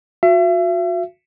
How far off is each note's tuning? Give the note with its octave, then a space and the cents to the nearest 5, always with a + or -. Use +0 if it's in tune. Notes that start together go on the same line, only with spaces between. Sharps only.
F#4 -35 E5 +40